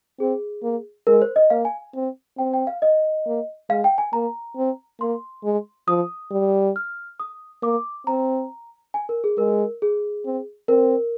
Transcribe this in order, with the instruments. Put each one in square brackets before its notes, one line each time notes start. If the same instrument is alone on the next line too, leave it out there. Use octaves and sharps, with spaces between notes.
[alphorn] C4 [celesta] G#4
[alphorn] A#3
[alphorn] G#3 [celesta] A#4
[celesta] C5
D#5
[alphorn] A#3 [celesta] F5
[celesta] G#5
[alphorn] C4
[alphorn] C4 [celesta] G5
[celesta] G5
F5
D#5
[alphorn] A#3
[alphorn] G#3 [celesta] F5
[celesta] G5
G#5
[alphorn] A#3 [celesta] A#5
[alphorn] C4
[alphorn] A#3 [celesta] C6
[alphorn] G#3
[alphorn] F3 [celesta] D#6
[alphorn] G3
[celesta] F6
D#6
[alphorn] A#3 [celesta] D6
[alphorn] C4 [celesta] A#5
[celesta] G#5
A#4
G#4
[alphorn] G#3 [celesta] A#4
[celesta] G#4
[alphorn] C4
[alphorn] C4 [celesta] A#4